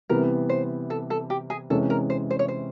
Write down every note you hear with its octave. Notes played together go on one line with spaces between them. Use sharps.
C3 E3 G3 B3 A#4
C5
A4
A4
G4
G#4
C3 E3 G#3 C#4 A4
A#4
C5
C5
C#5
C5